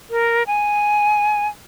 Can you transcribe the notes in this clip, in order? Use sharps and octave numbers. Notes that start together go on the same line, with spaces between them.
A#4
G#5